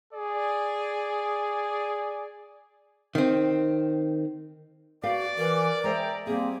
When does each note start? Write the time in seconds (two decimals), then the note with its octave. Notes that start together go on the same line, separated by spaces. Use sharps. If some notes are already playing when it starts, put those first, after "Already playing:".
0.13 G#4 D5
3.15 D#3 C4
5.04 F#4 B4 D5 F5 G5
5.38 E3 A#4
5.84 G#3 C5 E5 G5 A#5
6.27 G3 A#3 C4 G#4